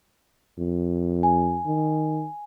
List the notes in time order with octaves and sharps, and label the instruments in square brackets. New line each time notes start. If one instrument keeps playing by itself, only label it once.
[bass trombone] F2
[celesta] G#5
[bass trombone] D#3